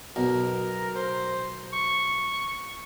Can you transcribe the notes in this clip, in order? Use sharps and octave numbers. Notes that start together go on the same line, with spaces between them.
B1 B2 A#4
C5
C#6